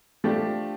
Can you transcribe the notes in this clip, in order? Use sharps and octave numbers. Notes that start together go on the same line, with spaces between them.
F3 A3 D4 G4